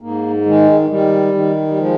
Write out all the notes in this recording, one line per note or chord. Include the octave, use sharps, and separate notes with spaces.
G#2 A#3
D#3 G#3
D#3 G3
D#3
G3
F3 G#3